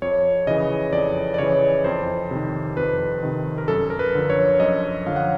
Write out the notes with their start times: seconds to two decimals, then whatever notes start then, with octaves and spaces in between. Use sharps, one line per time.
0.02 F2 C#5
0.47 C#3 E3 D#5
0.93 F2 D5
1.34 D5
1.38 C#3 E3 C#5
1.84 F2 C5
2.31 C3 D#3
2.77 F2 B4
3.23 C3 D#3
3.58 A#4
3.68 F#2 A4
3.90 A#4
3.99 B4
4.15 D3 F3
4.30 C#5
4.60 F#2 D#5
5.06 D3 F3 F5
5.16 F#5